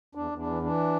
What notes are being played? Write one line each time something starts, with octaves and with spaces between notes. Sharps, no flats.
E2 D4
E2
D4
E3
E3 D4